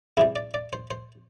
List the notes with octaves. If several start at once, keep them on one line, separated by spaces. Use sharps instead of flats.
E2 C3 G3 E4
D5
D5
C5
C5